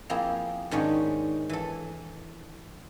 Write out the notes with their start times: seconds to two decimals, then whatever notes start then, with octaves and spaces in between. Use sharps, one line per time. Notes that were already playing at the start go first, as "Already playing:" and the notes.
0.10 F3 A#3 C4 E4 G#4
0.71 G#2 D#3 C#4 D4
1.49 E3 A4